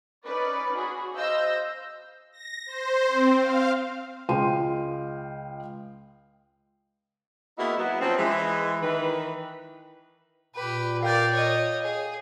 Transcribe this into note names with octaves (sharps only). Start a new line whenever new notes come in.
C#4 D#4 B4 D5
F#4 G#4 B5
C5 D#5 F5 E6 G6 A#6
A#6
C5
C4
F5
C#2 G#3 F5 G5 C6 D#7
A#3 B3 D#4 E4 F#4 G#4
F#3 B3 E4
F3 C4 C#4
E3 G#3
D#3 E3 B4
A#2 G4 B4
A#4 D5 F5 G5 G6
C#5 D#5
G#4